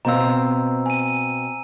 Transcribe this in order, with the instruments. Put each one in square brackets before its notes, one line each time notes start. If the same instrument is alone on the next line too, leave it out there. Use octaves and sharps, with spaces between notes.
[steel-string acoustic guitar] B2 C4 F5 [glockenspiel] A#5 E6
[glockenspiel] G#5 D#7